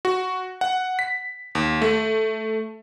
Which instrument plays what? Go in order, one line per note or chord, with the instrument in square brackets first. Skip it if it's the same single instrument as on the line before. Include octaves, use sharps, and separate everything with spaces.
[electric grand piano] F#4
F#5
B6
D#2
A3